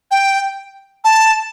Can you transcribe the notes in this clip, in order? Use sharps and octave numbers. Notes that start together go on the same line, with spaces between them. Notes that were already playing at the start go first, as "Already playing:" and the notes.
G5
A5